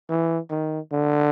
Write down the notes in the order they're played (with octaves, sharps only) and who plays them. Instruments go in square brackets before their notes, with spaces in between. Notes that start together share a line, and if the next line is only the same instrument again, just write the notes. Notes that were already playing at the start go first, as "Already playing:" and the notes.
[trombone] E3
D#3
D3